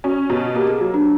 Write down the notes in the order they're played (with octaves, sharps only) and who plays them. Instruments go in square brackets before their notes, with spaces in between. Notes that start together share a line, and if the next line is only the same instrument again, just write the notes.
[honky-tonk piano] C#4 [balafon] F#4
[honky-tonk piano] B2
[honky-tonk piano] A#3 [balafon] G4
[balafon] G#4
[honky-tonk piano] F#3
[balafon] D4